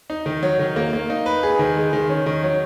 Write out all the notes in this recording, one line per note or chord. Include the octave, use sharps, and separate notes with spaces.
D#4
D#3
F#3
D#3
A#3
A#3
D#4
B4
G#4
D#3
G#3
D#3
C#4
D#3
F#3